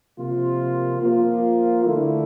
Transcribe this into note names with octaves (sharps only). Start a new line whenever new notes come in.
C3 F3 A#3 F4
F3 A#3 F4
D3 A3 E4